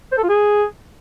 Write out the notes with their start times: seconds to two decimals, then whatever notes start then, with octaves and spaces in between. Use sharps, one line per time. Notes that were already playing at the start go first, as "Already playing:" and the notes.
0.12 C5
0.18 A4
0.23 F4
0.29 G#4